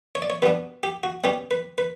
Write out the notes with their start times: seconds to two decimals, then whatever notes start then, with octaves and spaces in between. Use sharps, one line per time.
0.15 C#5
0.22 D5
0.30 C#5
0.42 B2 G3 B3 D4 B4
0.83 G4
1.03 F#4
1.24 B2 G3 C#4 G4
1.51 B4
1.78 B4